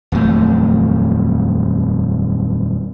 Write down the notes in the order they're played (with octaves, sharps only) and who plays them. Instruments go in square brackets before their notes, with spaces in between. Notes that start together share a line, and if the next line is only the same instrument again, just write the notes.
[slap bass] D#1 F2 F#3 A3